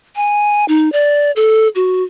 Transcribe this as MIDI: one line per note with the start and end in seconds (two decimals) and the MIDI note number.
0.16 0.65 80
0.68 0.92 63
0.92 1.31 74
1.36 1.68 69
1.75 2.03 66